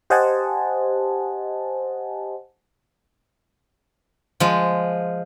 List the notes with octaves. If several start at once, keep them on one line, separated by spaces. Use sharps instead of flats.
G4 C5 D#5 F#5 G#5 A5
F3 G#3